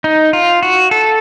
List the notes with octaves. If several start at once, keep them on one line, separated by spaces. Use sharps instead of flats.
D#4
F4
F#4
A4